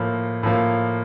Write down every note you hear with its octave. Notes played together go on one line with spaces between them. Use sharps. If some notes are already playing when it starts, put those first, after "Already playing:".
Already playing: A2 F3 A#3
A2 F3 A#3